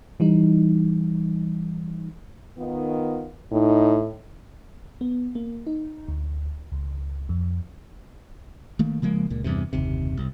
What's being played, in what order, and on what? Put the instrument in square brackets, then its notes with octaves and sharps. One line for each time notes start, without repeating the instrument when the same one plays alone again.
[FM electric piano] E3 G3 D#4
[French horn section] D#3 B3 F4
[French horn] A2 [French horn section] D#4
[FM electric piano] B3
A#3
D#4
D2
C#2
F2
[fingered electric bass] D#3 A3 A#3
C#3 F3 G#3 A#3
C#2 A#2
E2 G2 C3
F#1 D#2 C3
C2